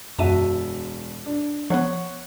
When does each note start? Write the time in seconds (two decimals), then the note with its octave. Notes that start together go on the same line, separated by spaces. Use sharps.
0.19 E1 F#2 F#4 E5 A5 D#7
1.26 D4
1.70 F3 B3 C#5 F#5